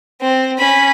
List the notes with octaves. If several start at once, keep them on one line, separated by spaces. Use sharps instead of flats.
C4
C#4 B5